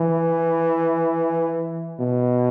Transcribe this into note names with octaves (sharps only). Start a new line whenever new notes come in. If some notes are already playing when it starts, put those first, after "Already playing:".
Already playing: E3
B2